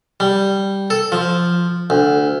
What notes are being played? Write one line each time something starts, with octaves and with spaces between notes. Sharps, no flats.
G3
A4
F3
D2